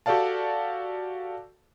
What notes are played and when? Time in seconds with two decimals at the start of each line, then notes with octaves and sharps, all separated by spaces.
0.06 F#4 G4 A4 D5 F5 A5